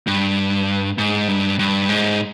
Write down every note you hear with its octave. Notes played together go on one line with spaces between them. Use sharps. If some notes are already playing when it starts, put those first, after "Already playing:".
G2
G#2
G2
G2
G#2